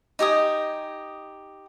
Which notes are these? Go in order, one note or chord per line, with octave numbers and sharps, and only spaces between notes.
D#4 G4 G#5 D#6